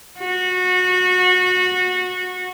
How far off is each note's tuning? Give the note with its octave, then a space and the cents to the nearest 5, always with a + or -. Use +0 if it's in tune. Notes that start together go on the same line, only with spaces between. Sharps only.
F#4 -20